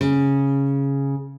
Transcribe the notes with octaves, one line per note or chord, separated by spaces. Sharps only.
C#3